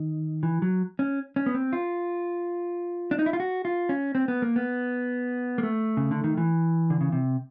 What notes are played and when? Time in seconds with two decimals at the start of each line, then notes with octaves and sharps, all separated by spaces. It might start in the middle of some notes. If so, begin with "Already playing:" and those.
Already playing: D#3
0.43 E3
0.62 F#3
0.99 C#4
1.36 C#4
1.46 B3
1.54 C4
1.73 F4
3.11 D4
3.19 D#4
3.26 E4
3.33 F4
3.40 F#4
3.65 F4
3.89 C#4
4.15 C4
4.28 B3
4.42 A#3
4.56 B3
5.58 A#3
5.63 A3
5.97 C#3
6.11 D3
6.24 D#3
6.37 E3
6.90 D3
7.01 C#3
7.12 C3